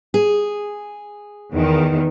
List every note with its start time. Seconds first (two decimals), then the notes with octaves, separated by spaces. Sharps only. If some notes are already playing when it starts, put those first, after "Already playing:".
0.14 G#4
1.53 E2 D#3